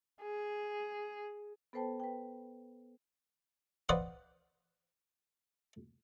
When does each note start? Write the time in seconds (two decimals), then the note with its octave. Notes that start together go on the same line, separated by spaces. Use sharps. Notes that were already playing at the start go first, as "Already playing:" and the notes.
0.22 G#4
1.73 B3 A4 B4 C5 G5 A5
2.00 B4 G5
3.89 B4 C5 D5 D#5 F5 F#5